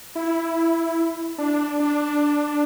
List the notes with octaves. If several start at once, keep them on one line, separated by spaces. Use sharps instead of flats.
E4
D4
D4